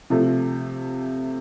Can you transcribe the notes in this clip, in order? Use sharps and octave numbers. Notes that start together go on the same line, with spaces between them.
C3 F3 A3